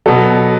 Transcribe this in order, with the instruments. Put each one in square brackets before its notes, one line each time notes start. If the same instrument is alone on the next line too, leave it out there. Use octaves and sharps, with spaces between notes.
[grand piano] B2 F#3 A4